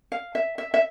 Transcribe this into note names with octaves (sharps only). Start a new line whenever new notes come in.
F5
E5
E5
E5